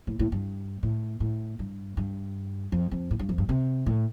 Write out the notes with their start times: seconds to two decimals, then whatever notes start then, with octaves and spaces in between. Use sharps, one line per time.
0.07 A2
0.19 A2
0.32 G2
0.83 A2
1.20 A2
1.59 G2
1.97 G2
2.72 F2
2.91 F2
3.11 A2
3.19 G2
3.29 F2
3.38 G2
3.49 C3
3.86 A2